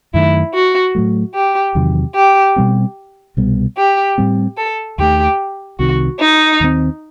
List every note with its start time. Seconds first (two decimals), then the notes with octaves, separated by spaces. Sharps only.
0.14 F#2 D#3 A3 E4
0.54 F#4
0.95 A2 F#3 A3
1.35 G4
1.75 E2 C3 D#3 F#3
2.15 G4
2.56 B2 G3 C4
3.37 C2 B2 G3 B3
3.77 G4
4.18 A2 G3 C4
4.58 A4
4.98 D#2 D#3 A3 G4
5.79 C2 C3 D#3 F#4
6.19 D#4
6.60 D#2 D#3 A3 C4